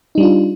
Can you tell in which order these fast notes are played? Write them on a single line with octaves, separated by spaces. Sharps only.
D#4 G3 D4 F4